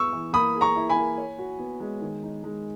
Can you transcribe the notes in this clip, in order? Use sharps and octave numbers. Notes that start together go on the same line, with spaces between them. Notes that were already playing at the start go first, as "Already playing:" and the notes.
Already playing: B3 E4 G#4 C#6 E6
E3
A#3 B5 D#6
G#4
A#5 C#6
E4
G#5 B5
A#3
C#5
F#4
B3
G#3
D#3
D#4
G#3